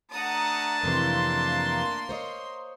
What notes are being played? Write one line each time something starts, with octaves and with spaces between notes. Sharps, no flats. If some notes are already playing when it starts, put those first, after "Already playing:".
A3 D4 F#5 A5 A#5 D#6
F2 C3 E3 A#3 C6
C5 C#5 D#5